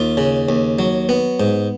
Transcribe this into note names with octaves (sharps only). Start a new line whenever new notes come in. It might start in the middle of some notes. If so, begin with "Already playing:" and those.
Already playing: D#2 F4
C#3
D#2
F#3
B3
G#2